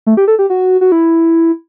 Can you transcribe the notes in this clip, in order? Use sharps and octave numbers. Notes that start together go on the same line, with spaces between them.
A3
G4
A4
G4
F#4
F#4
E4